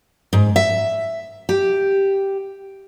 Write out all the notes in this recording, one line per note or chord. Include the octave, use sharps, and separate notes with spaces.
G#2
E5
G4